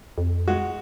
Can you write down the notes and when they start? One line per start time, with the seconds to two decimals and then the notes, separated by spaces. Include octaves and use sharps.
0.18 F2
0.48 G#3 F#4